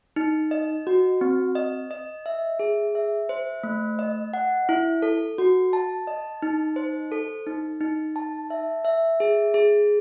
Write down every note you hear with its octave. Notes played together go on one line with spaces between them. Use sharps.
D#4
D#5
F#4
C4
D#5
D#5
E5
G#4
E5
C5
A3
D#5
F#5
E4
A4
F#4
A5
D#5
D#4
C5
A4
D#4
D#4
A5
E5
E5
G#4
G#4